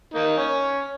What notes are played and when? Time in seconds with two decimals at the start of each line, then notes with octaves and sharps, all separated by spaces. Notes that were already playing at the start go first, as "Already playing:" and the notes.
0.14 A#3 D#4
0.38 C#4